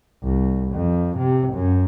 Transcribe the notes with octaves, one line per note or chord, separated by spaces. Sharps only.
C2
F2
C3
F#2